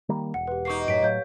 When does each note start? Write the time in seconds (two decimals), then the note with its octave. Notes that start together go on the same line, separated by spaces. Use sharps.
0.09 D#3 G3 A#3
0.34 E1 F#5
0.47 G4 B4
0.65 A#3 D#4 C#6 C7
0.88 F#2 A2 C#5 B6 D7
1.03 A2 F#3 C#5 F5 G6